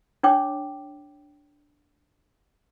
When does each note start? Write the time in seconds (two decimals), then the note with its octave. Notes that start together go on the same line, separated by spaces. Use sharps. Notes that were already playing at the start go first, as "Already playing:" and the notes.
0.23 D4 C#5 G5 D6